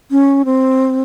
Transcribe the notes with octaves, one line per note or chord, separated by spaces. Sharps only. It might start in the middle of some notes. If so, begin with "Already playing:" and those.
C#4
C4